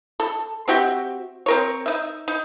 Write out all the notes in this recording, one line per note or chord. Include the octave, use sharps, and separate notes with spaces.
A4
C4 F#4 G4 E5
C4 A#4 C#5
D#4 E5
D#4